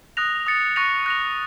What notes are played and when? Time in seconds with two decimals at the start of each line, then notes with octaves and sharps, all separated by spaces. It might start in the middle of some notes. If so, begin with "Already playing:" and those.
0.17 D#6 F#6 A#6 F7
0.47 D#6 A6 C#7
0.76 C#6 F#6 A#6 C#7 F7
1.06 F#6 A#6 F7